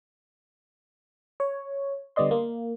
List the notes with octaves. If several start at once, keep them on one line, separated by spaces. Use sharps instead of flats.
C#5
D3 G3 B3 D5 D#5 C6
A#3